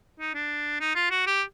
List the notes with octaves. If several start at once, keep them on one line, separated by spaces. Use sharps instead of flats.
D#4
D4
D#4
F4
F#4
G4